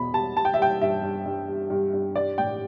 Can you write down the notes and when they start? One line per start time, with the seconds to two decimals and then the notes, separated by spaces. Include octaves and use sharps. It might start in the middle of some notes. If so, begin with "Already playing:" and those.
Already playing: E2 B2 B5
0.13 G3 A5
0.36 G3 A5
0.45 G5
0.54 E5
0.59 G3 G5
0.81 G2 E5
1.03 G2
1.26 G2
1.48 G3
1.70 G2
1.94 G2
2.16 G3 D5
2.38 A2 G5